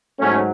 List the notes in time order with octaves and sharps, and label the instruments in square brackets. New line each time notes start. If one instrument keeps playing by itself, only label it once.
[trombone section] G#2 F#3 A3 C#4